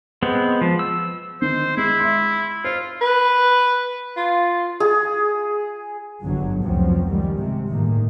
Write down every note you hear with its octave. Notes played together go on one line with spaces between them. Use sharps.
G#3 B3 C4
F3
E6
D3 D#3 C5
G#3 E4
E5 C6
F4 C5
B4
F4
G#4
G1 G2 D3 F#3
F1 C#2 B2 F3 F#3 C4
D#3 G3 G#3
C3
G1 A2 D#3 G#3 A#3